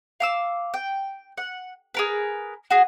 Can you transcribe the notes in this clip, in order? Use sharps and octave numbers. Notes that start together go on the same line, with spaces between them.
F5 D6 E6
G5
F#5
G#4 A#4 B4
F#4 G#4